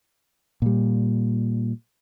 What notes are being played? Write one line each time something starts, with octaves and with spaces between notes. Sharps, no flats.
A#2 G3